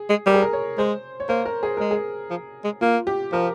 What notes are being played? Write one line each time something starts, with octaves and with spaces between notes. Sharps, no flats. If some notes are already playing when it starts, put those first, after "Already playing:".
Already playing: G#4
G#3
G3 A#4
G#4
A#4
C#5
G#3 C5
C#5
A#3 C5
A#4
G#4
G#3 A#4
G#4
F3
G#3
A#3 F4
G4
F3 A#4